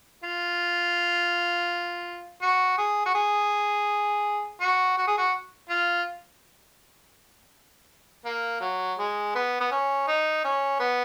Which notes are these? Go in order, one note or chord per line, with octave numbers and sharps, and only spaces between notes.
F4
F#4
G#4
F#4
G#4
F#4
F#4
G#4
F#4
F4
A#3
F#3
G#3
B3
B3
C#4
D#4
C#4
B3